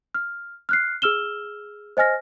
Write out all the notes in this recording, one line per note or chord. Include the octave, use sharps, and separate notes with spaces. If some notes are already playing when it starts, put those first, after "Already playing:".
F6
F6 F#6 C7
G#4 E6 F6 E7 G7
C5 D#5 G#5 F6 A#6